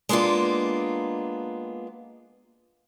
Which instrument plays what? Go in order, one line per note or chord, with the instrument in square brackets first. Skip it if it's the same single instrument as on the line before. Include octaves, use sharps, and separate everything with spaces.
[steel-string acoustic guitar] G#3 A#3 B3 D4 F4